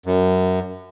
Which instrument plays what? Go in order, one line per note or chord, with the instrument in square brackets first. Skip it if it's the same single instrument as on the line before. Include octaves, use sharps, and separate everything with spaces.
[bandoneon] F#2